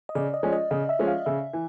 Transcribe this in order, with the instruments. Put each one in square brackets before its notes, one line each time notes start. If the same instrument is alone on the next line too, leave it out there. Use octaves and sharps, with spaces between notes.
[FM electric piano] D#5
[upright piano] C#3 [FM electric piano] D5
[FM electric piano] D#5
[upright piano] F3 G#3 C#4
[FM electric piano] D#5
[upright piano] C#3 [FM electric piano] D#5
[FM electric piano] E5
[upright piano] F3 G#3 C#4
[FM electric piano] F5
[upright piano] C#3 [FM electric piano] E5
[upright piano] E3